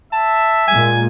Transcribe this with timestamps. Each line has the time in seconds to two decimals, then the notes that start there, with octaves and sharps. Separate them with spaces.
0.13 E5 A5
0.68 A#2 G#3 G#5